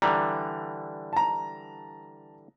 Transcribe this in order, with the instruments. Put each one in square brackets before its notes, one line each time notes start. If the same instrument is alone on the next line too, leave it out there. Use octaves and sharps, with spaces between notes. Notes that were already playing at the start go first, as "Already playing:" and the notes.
[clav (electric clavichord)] D3 E3 G3 [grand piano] A#5
[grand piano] A5 A#5